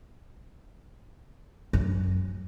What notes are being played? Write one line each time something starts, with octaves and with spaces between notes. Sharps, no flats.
F#2